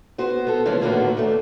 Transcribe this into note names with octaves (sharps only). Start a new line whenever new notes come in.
B3 F#4 C5
B3 A4
C3 E3 F3 G#3 A#3 C#4
A2 D3 D#3 A#3 B3 F#4
D#2 A3